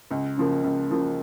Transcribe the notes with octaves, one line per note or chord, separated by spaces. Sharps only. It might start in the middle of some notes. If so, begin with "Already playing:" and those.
C#2
C#3 F3 A#3
C#2
C#3 F3 A#3